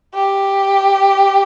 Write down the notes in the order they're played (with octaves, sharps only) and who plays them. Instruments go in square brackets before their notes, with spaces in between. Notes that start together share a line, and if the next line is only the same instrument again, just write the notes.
[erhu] G4